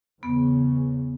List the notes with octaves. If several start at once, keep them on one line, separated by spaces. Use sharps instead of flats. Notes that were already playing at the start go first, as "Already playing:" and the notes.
E2 C#3 B3